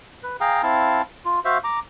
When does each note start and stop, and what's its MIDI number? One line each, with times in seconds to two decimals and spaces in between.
0.23 0.37 71
0.40 0.62 68
0.40 0.62 77
0.40 0.62 79
0.40 0.62 82
0.63 1.02 60
0.63 1.02 64
0.63 1.02 77
0.63 1.02 81
1.25 1.40 65
1.45 1.58 66
1.45 1.58 72
1.45 1.58 76
1.45 1.58 77
1.64 1.79 82
1.64 1.79 86